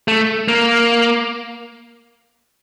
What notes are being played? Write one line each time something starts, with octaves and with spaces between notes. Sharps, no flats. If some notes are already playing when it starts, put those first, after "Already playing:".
A3
A#3